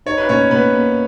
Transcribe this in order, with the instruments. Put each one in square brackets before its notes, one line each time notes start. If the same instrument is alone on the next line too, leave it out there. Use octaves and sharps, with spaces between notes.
[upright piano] D#4 [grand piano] C#5
[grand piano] B4
[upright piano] A#2 [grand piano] C#4 C#5
[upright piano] A#2 [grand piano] B3 B4
[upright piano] A#3